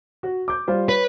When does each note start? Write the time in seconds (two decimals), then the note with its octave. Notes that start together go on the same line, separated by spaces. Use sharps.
0.23 F#4
0.48 D6 G6
0.68 G3 F4 C5
0.89 B4 C#5